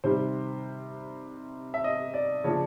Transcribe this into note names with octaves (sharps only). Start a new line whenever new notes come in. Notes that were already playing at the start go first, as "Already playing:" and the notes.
C3 D#3 G3 C5
E5
D#5
D5
C#3 F3 A#3 D4 C#5